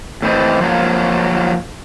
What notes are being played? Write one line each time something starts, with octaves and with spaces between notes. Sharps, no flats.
A2 E3 C4 D#5
F3 F#3 A#3 C#5